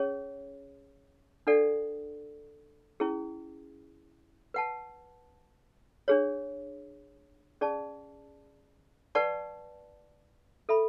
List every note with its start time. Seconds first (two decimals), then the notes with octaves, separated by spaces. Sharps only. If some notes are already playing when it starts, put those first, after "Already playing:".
Already playing: C#4 G#4 C#5
1.47 D4 A4 D5 F#5
3.00 C#4 E4 G#4
4.54 B4 F#5 A5
6.08 D4 G#4 C#5
7.61 C#4 G#4 D5 A5
9.15 B4 D5 F#5 A5 C#6
10.69 A4 E5 B5